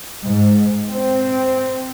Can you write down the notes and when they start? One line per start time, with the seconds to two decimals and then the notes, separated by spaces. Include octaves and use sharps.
0.24 G#2
0.91 C4